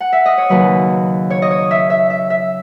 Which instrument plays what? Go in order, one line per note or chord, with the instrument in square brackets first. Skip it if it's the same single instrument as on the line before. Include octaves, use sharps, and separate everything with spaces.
[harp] F#5
E5
D#5
C#5
D#2 C#3 F#3 B4
C#5
D#5
C#5
E5
E5
E5
E5